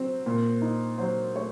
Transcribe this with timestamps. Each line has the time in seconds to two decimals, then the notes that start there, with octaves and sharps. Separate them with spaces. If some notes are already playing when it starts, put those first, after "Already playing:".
Already playing: F#3 C4
0.26 A#2
0.62 D#4
0.98 F#3 C5
1.35 A3 C#5